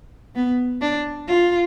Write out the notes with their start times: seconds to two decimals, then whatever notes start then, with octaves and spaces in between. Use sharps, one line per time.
0.36 B3
0.82 D4
1.28 F4